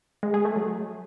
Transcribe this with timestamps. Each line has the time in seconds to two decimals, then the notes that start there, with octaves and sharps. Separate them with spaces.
0.23 G#3
0.34 G#4
0.45 A3
0.56 F#3